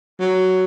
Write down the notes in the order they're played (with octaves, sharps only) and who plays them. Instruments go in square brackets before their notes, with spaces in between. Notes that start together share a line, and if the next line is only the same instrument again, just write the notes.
[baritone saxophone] F#3